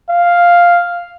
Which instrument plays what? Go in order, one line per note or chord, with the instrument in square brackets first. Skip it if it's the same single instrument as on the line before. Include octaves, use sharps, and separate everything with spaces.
[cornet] F5